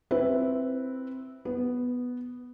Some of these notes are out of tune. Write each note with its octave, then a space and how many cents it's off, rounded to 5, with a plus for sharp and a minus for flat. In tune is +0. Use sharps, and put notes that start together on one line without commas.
C4 +0 E4 +0 B4 +0
B3 +0 B4 +0